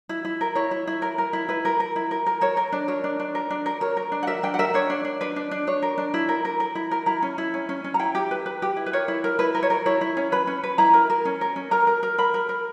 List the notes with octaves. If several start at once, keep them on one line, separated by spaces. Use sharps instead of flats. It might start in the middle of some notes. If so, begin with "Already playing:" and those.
E4
E4
A#4
E4 C#5
E4
E4
A#4
A#4
E4
E4 B4
A#4
A#4
E4
A#4
A#4
A#4 C#5
A#4
D4
A#4 C#5
D4
D4
A#4
D4
A#4
A#4 C#5
A#4
D4
F#5
A#4 E5
D4 G5
F#5
A#4 E5
D4 C#5
D4
D4
D4 B4
D4
D4
D4 C#5
A#4
D4
E4
A#4
A#4
A#4
E4
A#4
E4 A#5
C#4
E4
C#4
C#4
C#4
A#5
E4 G5
G4
B4
B4
G4
E4
B4
A#4 C#5
E4
A#4
E4 B4
A#4
C#5
A#4
E4 C#5
E4
C#4
B4 B5
C#4
B4
E4 A#5
A#4
A#4
C#4
A#4
C#4
A#4 A#5
A#4
A#4
A#4 B5
A#4
A#4